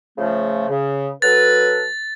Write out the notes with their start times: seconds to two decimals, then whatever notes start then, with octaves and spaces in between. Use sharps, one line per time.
0.18 C#3 F3 A3
0.68 C#3
1.22 F#3 A4 B4 A6